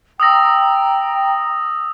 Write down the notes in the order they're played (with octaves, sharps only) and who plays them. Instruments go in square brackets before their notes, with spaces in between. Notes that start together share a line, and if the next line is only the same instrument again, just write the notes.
[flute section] G5 A#5 [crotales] D#6 E6 A#6